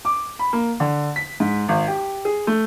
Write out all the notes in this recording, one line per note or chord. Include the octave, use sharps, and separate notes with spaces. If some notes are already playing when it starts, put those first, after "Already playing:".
D6
B5
A#3
D3
B6
G#2
G#1
G4
G#4
A3